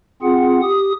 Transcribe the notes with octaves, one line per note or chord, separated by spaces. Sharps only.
C4 F4 G#4 F#5
G4 D#6